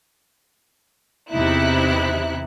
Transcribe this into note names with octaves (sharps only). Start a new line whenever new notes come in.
E2 C3 D#4 E4 F#6